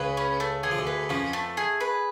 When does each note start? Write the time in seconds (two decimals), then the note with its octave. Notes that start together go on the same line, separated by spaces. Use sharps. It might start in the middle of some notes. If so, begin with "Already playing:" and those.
Already playing: C#2 C#3 G#4 B4
0.17 C#4
0.40 A3
0.63 D3 G#4
0.71 F3
0.78 D2 D3
0.87 B4
1.09 F2 F3 C#4
1.33 A3
1.57 G#4
1.80 B4